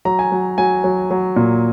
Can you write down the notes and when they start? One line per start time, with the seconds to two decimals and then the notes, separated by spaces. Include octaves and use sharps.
0.05 F#3 A#5
0.19 G#5
0.32 F#3
0.58 F#3 G#5
0.84 F#3
1.11 F#3
1.36 A#2